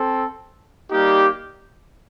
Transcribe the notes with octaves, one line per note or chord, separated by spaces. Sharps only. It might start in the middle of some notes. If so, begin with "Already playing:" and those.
Already playing: C4 A4
G3 A#3 D#4 G4